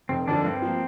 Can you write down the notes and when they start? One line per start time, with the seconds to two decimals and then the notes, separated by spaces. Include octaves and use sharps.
0.09 F1 C4
0.27 D#2 D3 F3 D4
0.44 G2 C4
0.62 F3 A#3